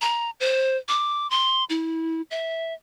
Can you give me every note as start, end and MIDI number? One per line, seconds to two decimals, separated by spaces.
0.01 0.30 82
0.40 0.77 72
0.88 1.29 86
1.30 1.64 84
1.70 2.22 64
2.31 2.74 76